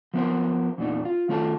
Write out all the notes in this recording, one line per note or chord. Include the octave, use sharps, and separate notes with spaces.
F3 B3 A#4 C5
E2 A#2 D4 D#4
F4
D#3 A3 F4 A4 F#5 A5